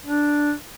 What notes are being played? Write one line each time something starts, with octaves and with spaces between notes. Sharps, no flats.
D4